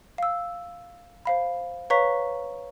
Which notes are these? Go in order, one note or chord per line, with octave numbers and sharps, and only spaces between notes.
F5 E6
C5 F5 B5
B4 C#5 F5 A#5 C#6 B6